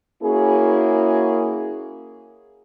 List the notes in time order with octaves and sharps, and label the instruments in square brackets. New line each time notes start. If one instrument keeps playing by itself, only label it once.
[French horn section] A#3 C#4 E4 F#4 G#4